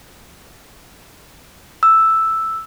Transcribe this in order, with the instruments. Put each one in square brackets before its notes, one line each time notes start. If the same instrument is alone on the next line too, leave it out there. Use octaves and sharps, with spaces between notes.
[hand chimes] E6